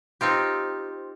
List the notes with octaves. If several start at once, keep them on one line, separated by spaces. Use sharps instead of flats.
C4 D#4 F4 G4